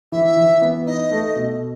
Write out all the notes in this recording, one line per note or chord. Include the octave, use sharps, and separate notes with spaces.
E3 E5
E3
B3
D#4 D#5
A3
B2